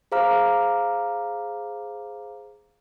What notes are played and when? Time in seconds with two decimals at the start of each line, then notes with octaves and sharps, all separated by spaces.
0.12 G#4 C5 F5 A#5 D6 F6